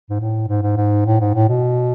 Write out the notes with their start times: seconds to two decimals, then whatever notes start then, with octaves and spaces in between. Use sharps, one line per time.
0.10 G#2
0.20 A2
0.48 G#2
0.63 G#2
0.77 G#2
1.06 A2
1.20 G#2
1.35 A2
1.49 B2